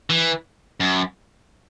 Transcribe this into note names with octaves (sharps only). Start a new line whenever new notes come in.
E3
F#2